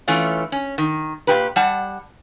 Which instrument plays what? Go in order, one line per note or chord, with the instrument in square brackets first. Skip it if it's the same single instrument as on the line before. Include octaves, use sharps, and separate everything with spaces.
[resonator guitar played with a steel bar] E3 A3 C#4 F4
C#4
D#3
A#2 G4 B4
G3 F#5 A5